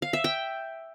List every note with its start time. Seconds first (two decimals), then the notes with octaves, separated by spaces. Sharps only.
0.02 F5
0.13 E5
0.24 G5